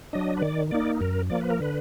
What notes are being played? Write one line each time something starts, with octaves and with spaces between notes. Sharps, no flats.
F#3 D4 D#5
B4
D#3 D5
A#3 D#4 D5
F#2 A#4
F3 A#3 D5
B4
A#4
D3 B4